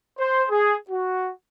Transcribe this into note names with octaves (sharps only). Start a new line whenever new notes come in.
C5
G#4
F#4